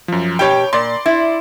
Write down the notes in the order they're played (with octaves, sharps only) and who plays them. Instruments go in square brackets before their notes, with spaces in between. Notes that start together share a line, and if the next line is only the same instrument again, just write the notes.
[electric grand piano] F#2 F3
[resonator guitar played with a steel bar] B2 G4 [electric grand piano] C#5 G5
[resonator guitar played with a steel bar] A#2 [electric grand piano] D5 C6
[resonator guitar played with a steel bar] E4